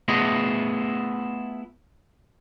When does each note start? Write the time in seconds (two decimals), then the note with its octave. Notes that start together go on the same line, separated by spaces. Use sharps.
0.08 A3 B3 E4 F4 G#4 D#5